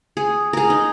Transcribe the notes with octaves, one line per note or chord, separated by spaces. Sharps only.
G#4
G#4 A#4
D#4